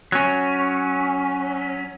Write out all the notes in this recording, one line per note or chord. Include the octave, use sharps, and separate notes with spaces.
F#3 C#4